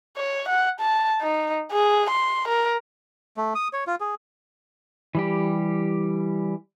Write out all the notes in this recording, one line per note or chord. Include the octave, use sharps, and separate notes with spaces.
C#5
F#5
A5
D#4
G#4
C6
A#4
A3
D#6
C#5
F4
G#4
E3 G3 G4